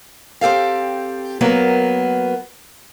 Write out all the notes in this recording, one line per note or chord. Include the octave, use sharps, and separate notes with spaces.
C4 G4 A4 F5
F#3 A#3 B3 A#4